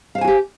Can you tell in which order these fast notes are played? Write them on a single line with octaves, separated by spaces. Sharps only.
F5 C5 G#5 F#4 G4